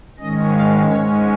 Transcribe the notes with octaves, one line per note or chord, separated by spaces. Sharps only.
G#2 D#3 G#3 C#4 D#5
F5
G#2 G#3 C#4 C#5